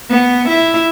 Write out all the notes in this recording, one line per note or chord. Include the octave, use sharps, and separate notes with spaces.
B3
E4